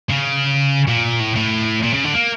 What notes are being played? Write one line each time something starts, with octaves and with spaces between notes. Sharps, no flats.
C#3
A#2
A2
A2
A#2
C#3
D3
A#3